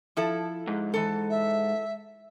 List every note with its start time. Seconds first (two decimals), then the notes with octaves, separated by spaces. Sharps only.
0.17 F3 E4 A4
0.67 G#2
0.94 E3 A4
1.30 E5